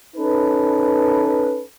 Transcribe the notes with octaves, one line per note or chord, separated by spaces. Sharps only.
C#4 D#4 A4 B4